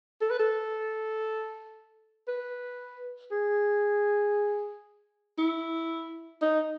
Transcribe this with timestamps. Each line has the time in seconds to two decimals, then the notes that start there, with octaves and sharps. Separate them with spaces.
0.21 A4
0.30 B4
0.39 A4
2.28 B4
3.32 G#4
5.38 E4
6.42 D#4